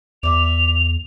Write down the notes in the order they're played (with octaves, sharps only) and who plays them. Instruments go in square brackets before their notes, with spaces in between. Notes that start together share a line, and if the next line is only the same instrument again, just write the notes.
[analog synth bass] E2 [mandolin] D5 E5 [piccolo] F7